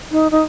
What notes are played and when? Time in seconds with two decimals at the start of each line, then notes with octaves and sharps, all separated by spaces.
0.11 D#4
0.31 D#4